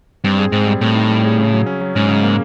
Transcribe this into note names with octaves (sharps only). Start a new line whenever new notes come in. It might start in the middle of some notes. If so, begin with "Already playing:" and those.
G2 C4
G#4
G#2 C4
G3
A2 C4
D#4
G3
G#4
C#3
F#3
C#4
F#3
G#2 C#4
C#3
A#3